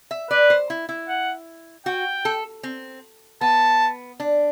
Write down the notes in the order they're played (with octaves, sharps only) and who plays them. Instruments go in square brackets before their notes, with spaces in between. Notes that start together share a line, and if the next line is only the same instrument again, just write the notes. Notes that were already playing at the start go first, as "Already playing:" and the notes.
[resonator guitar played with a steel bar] E5
[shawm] B4 [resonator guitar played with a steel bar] D5
[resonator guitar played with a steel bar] C5
E4
E4
[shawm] F#5
[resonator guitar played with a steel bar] F#4 [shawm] G5
[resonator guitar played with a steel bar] A4
C4
[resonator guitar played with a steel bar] B3 [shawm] A5
[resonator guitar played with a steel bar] D4